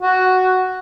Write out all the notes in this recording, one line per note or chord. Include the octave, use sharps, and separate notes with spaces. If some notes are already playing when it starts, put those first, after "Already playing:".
F#4